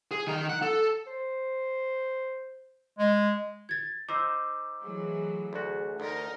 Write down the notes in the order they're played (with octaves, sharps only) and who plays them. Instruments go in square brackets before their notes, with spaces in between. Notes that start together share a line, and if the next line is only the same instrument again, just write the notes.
[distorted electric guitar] G#4
D#3 A#5
F#5
A4
[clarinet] C5
G#3
[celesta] G#6 A6
[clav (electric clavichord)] D#4 C5 [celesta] D6 E6
[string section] E3 F#3 [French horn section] A3 G#4
[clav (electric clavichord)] D2 F#4
[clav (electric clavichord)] D2 [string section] D#4 A#4